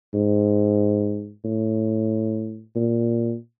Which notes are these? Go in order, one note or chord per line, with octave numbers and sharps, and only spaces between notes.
G#2
A2
A#2